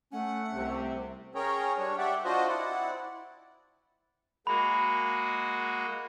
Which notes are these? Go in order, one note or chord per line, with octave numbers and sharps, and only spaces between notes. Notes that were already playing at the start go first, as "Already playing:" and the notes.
A3 C#4 F#5
C2 C3
C#4 G#4 A#4 C#5 G5 A#5
G3 D4 C#5
G4 D5 E5 F#5 G5
D4 F4 F#4 C5 D#5
C4 E4 D5 F#5
G#3 A#3 F#4 B5